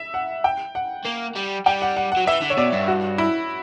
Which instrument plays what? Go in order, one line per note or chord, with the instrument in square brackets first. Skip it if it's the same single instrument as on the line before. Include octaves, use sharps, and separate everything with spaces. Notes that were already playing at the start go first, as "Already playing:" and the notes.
Already playing: [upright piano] E5
F#5
G5
F#5
[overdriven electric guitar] A#3
G3
[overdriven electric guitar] G3 [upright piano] G5
[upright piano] F#5
F#5
F#5
[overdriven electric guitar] F#3
[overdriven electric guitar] E3 [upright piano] E5
[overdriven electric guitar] D3
[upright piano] C#5
[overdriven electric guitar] B2 [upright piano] D5
[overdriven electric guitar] G2
[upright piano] F#4
E4